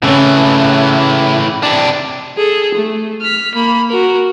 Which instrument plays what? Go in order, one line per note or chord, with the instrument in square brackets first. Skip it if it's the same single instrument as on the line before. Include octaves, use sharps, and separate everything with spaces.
[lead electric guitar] A2 E3 [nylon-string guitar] C#3 C#4
[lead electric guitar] C3 D4
[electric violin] G#4 A4
A3
F6 B6
A#3 B5
F#4 A#4